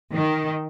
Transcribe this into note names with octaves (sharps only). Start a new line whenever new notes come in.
D#3